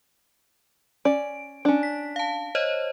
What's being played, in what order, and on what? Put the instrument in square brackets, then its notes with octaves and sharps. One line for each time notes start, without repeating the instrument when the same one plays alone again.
[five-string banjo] C#4 D5 [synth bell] D7
[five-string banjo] C#4 D4
[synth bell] B6
F5 A5
C5 C#5 D#5